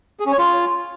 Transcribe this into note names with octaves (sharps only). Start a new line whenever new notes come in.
G#4
C#4
C#5
F4